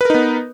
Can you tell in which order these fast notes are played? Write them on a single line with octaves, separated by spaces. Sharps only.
B4 A#4 D#4 B3